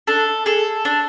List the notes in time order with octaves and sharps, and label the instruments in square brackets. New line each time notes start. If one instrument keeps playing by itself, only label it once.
[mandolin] D4 A4
G#4 A4
D4